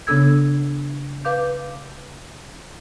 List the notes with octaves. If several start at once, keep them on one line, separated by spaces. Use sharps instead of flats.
C#3 B3 D4 A4 E6 G#6
B4 F5 D6 G6